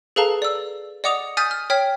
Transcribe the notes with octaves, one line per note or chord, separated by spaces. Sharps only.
G#4 A4 B4 F5 A5 A#5
D5 E6
D5 D#5 F#5 D6 D#6 F7
G#5 D#6 F6 G6 A6 B6
F6
C#5 G5 F6 B6